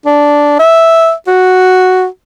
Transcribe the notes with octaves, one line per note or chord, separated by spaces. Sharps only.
D4
E5
F#4